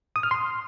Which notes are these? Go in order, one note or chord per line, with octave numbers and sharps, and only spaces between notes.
D#6
F6
C6